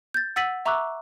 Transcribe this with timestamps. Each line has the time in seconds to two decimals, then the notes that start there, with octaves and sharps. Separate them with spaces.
0.14 G6 A6
0.36 F#5 E6 A6 B6 D#7 F#7
0.65 E5 A#5 C#6 D6 E6 F#6